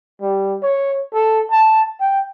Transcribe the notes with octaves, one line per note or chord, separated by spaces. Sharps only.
G3
C#5
A4
A5
G5